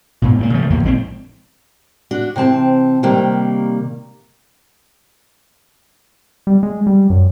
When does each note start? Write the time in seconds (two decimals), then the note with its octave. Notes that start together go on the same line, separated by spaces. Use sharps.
0.22 G#2 B2
0.39 A#2 A3 A#3
0.54 C#3 F3 A3
0.70 E2 G#2 C#3 A#3
0.83 A#1 G#3 C4
2.11 D4 F#4
2.36 C3 E3 C4 A5
3.03 C3 D#3 G3 A#3
6.47 G3
6.63 G#3
6.87 G3
7.10 F#2